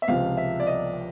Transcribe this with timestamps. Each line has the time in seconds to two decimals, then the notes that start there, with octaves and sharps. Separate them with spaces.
0.02 E5
0.08 C#2 C3 F3 F5
0.37 E5
0.60 D5
0.67 D#5